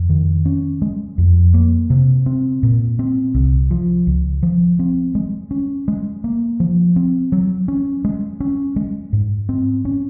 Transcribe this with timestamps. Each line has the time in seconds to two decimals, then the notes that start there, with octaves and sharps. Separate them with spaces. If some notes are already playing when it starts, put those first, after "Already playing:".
Already playing: F2
0.09 D#3
0.45 C#4
0.82 G#3
1.18 F2
1.54 A#3
1.90 C3
2.26 C4
2.63 A#2
2.99 C4
3.34 C2
3.71 F3
4.07 C#2
4.43 F3
4.79 C4
5.15 G#3
5.51 C#4
5.88 G#3
6.24 A#3
6.60 F3
6.96 C4
7.32 F#3
7.68 C#4
8.05 G#3
8.40 C#4
8.76 G#3
9.13 G#2
9.49 C4
9.85 C#4